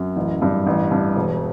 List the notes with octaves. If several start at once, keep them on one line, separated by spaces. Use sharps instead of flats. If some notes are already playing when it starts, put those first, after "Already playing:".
Already playing: F#2
A1
G2
A1
G2
E1